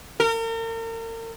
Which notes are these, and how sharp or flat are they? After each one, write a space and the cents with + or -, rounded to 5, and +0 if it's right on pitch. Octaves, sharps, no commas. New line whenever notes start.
A#4 -40